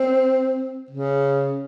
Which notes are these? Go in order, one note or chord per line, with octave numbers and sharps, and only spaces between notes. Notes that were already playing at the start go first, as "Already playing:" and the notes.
Already playing: C4
C#3